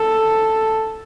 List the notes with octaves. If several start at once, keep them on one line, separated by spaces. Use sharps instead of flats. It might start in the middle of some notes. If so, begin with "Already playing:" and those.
Already playing: A4